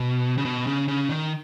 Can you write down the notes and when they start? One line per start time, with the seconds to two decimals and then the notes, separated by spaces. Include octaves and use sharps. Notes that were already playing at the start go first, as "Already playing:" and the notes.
Already playing: B2
0.38 C#3
0.45 B2
0.67 C#3
0.88 C#3
1.09 D#3